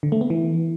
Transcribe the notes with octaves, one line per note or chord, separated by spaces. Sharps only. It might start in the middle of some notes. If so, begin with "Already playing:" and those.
D3
A3
B3
E3